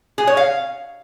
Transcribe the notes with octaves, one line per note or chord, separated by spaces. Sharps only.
G#4
C#5
F5